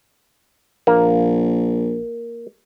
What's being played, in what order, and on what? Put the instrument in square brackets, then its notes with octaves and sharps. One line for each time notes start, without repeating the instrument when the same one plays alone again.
[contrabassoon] A#1 [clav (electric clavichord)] A#3